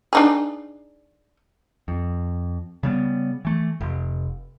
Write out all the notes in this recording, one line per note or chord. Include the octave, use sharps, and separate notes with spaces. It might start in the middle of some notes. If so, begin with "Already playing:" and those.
D4 D#4 G#4
F2
C#3 G3 B3
E3 A3
F1